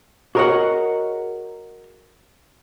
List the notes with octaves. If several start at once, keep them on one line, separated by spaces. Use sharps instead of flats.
F#4 G#4 A#4 C#5 D#5 F#5